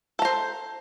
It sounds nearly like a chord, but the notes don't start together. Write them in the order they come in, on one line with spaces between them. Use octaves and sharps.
A4 A#5 C5